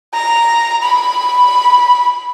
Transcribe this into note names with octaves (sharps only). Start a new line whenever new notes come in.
A#5
B5